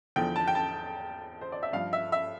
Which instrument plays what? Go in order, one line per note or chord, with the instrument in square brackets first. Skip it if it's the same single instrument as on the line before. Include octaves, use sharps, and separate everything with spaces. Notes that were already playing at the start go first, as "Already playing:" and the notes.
[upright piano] E2 D3 F3 G5
A5
G5
A5
C5
D5
E5
G2 F3 F5
E5
E5